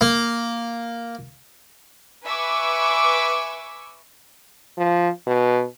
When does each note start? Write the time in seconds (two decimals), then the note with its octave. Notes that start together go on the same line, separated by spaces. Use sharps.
0.01 A#3
2.24 B4 E5 G#5 C#6 D6
4.77 F3
5.27 B2